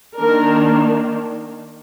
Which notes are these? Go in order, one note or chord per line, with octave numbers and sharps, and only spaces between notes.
D#3 A#3 D4 A#4